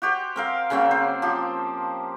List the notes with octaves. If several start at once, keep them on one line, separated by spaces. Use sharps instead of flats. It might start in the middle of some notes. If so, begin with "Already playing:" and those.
F#4 G4 C5
C4 A#4 F5
C#3 F#3 A#3 C4
C5
F3 G4